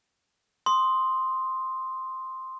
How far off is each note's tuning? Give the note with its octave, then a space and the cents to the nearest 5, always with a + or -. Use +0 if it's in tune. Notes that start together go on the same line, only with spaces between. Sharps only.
C6 +0 D#6 +0